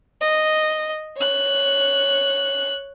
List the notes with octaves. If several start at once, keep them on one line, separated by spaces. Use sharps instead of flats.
D#5
C#5 F#6